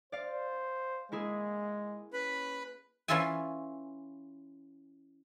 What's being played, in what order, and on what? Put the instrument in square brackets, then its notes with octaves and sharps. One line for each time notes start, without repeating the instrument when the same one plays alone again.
[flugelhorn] C5 [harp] D5 F5
[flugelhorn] G#3 [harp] A#3 E4 G#4
[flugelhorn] C#4 [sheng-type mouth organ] B4 B5
[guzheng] E3 C#4 F4 A4 E5 G#5